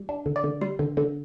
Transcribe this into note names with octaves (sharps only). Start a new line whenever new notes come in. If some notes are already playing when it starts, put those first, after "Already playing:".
Already playing: G3
D4
D3
D5
D3
G3 C6
D3
D3